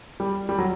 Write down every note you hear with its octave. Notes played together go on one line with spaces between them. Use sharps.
G3
G3
F#3